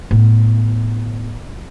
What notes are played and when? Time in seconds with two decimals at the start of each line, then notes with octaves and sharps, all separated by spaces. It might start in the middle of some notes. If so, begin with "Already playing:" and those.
0.11 A2 B3